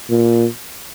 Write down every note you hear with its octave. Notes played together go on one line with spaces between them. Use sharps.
A#2